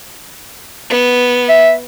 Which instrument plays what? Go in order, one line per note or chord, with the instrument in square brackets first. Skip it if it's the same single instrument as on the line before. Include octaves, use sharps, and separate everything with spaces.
[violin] B3
[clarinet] E5